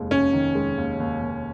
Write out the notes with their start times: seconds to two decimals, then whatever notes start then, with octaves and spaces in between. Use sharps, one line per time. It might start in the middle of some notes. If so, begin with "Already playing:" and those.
Already playing: F1 D#2 G#3
0.10 F1 C#4
0.33 D#3
0.55 G#3
0.78 D#2
1.00 D#2
1.22 D#2